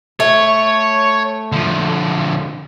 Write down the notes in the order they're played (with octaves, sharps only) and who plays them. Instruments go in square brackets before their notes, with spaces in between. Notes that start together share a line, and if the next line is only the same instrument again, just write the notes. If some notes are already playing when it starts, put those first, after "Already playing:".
[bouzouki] A3 [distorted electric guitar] C#5
[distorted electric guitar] D3 F3